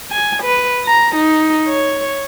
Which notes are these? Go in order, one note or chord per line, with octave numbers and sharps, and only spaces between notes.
G#5
B4
A#5
D#4
C#5